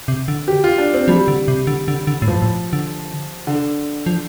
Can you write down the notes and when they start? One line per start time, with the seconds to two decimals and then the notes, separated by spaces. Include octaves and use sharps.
0.08 C3
0.28 D3
0.48 G4
0.64 F4
0.78 D4
0.94 C4
1.08 F3 G3
1.28 D3
1.48 C3
1.67 D3
1.88 D3
2.07 D3
2.22 A2
2.27 G2 F3
2.42 A2
2.73 D3
3.47 D3
4.06 F3